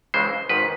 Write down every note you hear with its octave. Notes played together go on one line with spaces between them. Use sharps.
C#2 C#3 E3 G#3 C5
G#1 G#2 D#3 B4